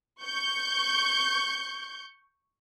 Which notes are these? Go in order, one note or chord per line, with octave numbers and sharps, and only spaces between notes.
C#6 G6